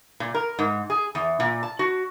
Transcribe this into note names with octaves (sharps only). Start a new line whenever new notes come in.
A#2
A#4
G#2
G#4
E2
A#2
A5
F#4